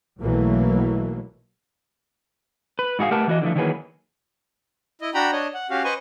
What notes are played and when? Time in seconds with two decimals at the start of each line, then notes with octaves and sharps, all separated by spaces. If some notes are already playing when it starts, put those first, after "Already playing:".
0.21 B1 B2 E3 F#3 A3 A#3
2.79 B4
2.99 G#2 F#4 G#4 F5
3.11 A3 G4 A#4 B4 F#5 A5
3.28 E3 F#4 D#5
3.42 D3 E3 F3 A3
3.56 D#3 E3 F#3 A#3 G#4 B4
5.01 E4 D#5
5.14 D4 F#4 G5 A#5 B5
5.32 D4 C#5 D#5
5.54 F#5
5.70 C#4 F#4 G4 F5
5.84 B4 C5 D#5 G#5 C#6